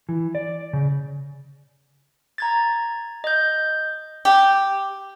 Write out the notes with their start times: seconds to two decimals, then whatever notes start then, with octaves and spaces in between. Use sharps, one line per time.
0.09 E3
0.35 D5
0.73 C#3
2.38 A#5 G#6 A6
3.24 D#5 G6
4.25 G4